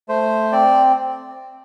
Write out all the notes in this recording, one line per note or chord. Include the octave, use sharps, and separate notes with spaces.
A3 C5
C4 D5